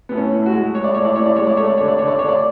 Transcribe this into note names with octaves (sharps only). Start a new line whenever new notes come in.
A2 B3
C#4
A2
F#4
G#3
G#3 C#5
D5
A2 C#5
D5
A2 C#5
D5
G#3 C#5
D5
A3 C#5
D5
D3 C#5
D5
D3 C#5
D5
A3 C#5
D5